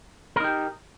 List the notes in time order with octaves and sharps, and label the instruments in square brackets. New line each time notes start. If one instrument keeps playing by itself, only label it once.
[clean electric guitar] A#4
D#4
G4